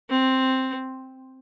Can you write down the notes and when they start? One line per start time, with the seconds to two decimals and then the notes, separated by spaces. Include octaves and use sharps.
0.10 C4